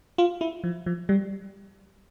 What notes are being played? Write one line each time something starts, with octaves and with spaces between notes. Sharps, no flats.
F4
E4
F3
F3
G3